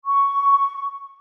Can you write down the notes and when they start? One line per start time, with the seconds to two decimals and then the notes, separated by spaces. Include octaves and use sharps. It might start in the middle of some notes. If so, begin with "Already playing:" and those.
0.05 C#6